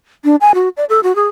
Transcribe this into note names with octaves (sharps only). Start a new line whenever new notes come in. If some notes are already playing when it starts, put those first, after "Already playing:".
D4
G#5
F#4
D5
A4
F#4
G#4